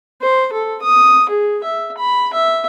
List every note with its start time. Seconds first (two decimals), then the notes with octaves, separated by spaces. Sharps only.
0.22 C5
0.53 A4
0.82 D#6
1.29 G#4
1.63 E5
1.98 B5
2.34 E5